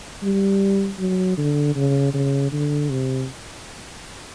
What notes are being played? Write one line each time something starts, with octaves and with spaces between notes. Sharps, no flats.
G3
F#3
D3
C#3
C#3
D3
C3